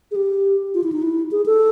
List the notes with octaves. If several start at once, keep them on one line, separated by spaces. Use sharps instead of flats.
G#4
G4
F4
E4
D#4
E4
G#4
A4